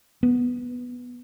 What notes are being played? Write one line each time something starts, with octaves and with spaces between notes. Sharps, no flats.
B3